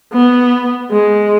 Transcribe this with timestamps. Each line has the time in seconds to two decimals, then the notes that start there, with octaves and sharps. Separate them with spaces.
0.13 B3
0.92 G#3